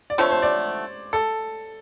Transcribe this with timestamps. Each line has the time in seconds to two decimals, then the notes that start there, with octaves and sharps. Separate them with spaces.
0.10 D5
0.18 D3 F3 A3 C4 C#5
0.31 C5
0.42 D5
1.13 A4